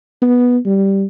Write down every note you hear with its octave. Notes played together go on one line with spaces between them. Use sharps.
B3
G3